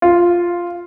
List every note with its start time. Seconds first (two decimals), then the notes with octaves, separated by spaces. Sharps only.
0.02 F4